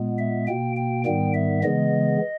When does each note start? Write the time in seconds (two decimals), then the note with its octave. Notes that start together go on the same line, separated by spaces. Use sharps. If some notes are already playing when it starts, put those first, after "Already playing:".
Already playing: A#2 G#3 B3
0.18 E5
0.47 B2 A#3 G5
0.76 G5
1.05 G#2 D#3 G3 B3 G5
1.34 E5
1.63 C#3 E3 G#3 B3 D#5